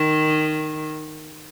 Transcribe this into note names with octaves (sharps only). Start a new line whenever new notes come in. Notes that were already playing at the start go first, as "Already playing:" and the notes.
Already playing: D#3